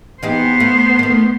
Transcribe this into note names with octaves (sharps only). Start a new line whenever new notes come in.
E3 B3 D#4 G4 C5
A3
D#3 A3